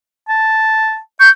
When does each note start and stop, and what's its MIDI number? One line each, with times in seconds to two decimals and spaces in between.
0.28 0.99 81
1.20 1.29 85
1.20 1.29 91